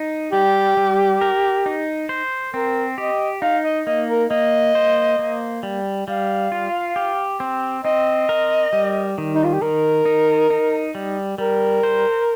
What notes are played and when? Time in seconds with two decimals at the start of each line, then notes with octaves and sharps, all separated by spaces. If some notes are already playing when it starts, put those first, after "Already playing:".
Already playing: D#4
0.32 G3 G4
0.77 G3
1.21 A#4
1.66 D#4
2.09 C5
2.54 C4 A#4
2.98 G4 D#5
3.42 D#4 F5
3.64 D#5
3.86 A#3 D#5
4.09 A#4
4.30 A#3 D#5
4.75 C5
5.19 A#3
5.63 G3
6.08 G3 F5
6.52 F4
6.96 G4
7.40 C4
7.85 C4 D#5
8.29 A#4
8.73 G3
9.18 D#3
9.35 D#4
9.44 F4
9.53 G4
9.61 D#3 A#4
10.06 D#4
10.50 D#4
10.95 G3
11.38 G3 A#4
11.83 C5